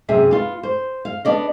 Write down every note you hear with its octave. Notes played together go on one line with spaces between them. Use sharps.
F#2 C3 G#4 E5
B3 F4
C5
F5
B3 D4 D5 D#5